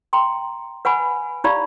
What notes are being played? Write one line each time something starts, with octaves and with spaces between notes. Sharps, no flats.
G5 A#5 C6
B4 F#5 G#5 B5
D#4 G4 D5 F5 A#5 B5